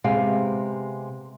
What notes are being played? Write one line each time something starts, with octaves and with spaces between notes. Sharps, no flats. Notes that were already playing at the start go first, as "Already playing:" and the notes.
C3 G#3 B3 G4 F5 G#5